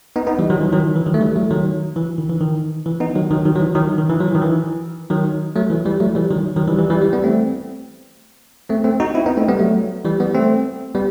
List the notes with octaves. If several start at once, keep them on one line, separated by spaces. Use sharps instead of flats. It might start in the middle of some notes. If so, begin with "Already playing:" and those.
B3 D#4
B3 D#4
E3 G3
D#3 F#3
E3
D#3 F#3
D#3
E3
D#3 F#3
A3
E3 G3
F#3 A3
D#3 F#3
E3
D#3
E3
D#3
E3
B3 D#4
D#3 F#3
D#3 F#3
D#3 F#3
F#3
E3
D#3 F#3
D#3
E3
F#3
E3
D#3
E3
D#3 F#3
F#3 A3
E3
E3 G3
F#3 A3
E3 G3
D#3 F#3
D#3 F#3
E3 G3
E3 G3
E3 G3
E3 G3
G3 B3
A3 C4
A3 C4
A3 C4
D#4 F#4
C4 E4
B3 D#4
A3 C4
G3 B3
F#3 A3
E3 G3
G3 B3
A3 C4
G3 B3